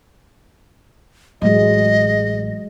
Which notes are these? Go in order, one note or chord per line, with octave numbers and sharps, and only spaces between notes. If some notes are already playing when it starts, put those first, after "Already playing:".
A1 F#3 G#3 D#5